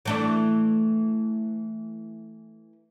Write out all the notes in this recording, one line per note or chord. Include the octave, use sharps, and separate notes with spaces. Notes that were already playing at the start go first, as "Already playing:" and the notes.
E3 A3 D4